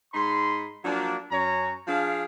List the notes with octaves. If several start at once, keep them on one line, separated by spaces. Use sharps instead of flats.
G#2 D#4 B5 C6
F3 F#3 A#3 D4
F#2 C#5 A#5
F3 D4 G#4 F5